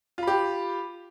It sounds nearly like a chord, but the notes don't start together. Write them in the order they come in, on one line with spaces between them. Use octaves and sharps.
F4 B5 G4